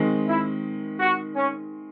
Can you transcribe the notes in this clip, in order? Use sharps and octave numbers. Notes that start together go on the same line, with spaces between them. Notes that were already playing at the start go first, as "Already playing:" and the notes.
Already playing: D#3 G#3 C4
E4
F#4
C#4